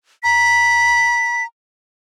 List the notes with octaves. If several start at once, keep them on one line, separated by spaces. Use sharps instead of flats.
A#5 B6